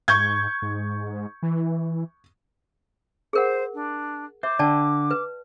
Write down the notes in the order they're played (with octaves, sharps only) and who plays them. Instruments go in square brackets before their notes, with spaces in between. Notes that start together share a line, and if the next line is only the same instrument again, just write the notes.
[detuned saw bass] G#2 [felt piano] C#6 G6 G#6
[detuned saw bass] G#2
E3
[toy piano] G#4 A#4 F#5 [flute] C5
[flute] D4
[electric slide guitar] C5 [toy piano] E5 [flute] D6
[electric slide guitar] D3 [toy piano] D5 G5 A5
[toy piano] B4